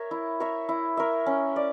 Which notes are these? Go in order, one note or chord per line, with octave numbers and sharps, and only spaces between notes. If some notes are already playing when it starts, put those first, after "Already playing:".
Already playing: A#4 C#5 E5
E4
A#4 C#5 E5
E4
A#4 C#5 E5
C#4
D5